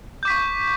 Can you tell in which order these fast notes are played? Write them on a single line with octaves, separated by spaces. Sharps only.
G6 D6 B6 C#6